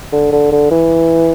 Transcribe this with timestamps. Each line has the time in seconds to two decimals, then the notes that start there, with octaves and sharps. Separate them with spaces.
0.13 D3
0.32 D3
0.52 D3
0.71 E3